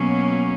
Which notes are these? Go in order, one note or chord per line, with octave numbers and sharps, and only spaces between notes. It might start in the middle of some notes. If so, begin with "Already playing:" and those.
Already playing: B2 F#3 A#3 C#4